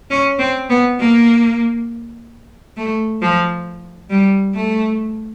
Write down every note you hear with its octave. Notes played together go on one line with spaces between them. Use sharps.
C#4
C4
B3
A#3
A3
F3
G3
A3